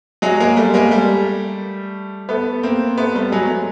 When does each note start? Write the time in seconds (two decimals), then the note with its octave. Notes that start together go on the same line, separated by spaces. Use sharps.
0.22 F#3 G#3
0.40 G#3 A#3
0.56 G3 A3
0.74 G#3 A#3
0.91 G3 A3
2.29 A3 B3
2.63 A#3 C4
2.97 A3 B3
3.15 G3 A3
3.32 F#3 G#3